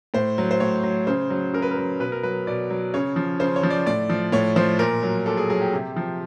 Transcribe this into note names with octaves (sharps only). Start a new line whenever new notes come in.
A2 C5
F#3
C5
A2 C#5
F#3
C#3 C5
F#3
C#3 A#4
B4
A#4
F#3
B2 B4
A#4
F#3 B4
B2 D5
F#3
C#3 C#5
F3
C#3 C5
C#5
F3
D5
A2 D5
F3
A2 C#5
F3 C5
A#2 A#4
F#3
A#2 A4
G#4
F#3 G#4
G4
C3
F3